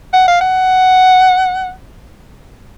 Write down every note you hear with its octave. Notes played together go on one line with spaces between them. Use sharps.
F#5
F5
F#5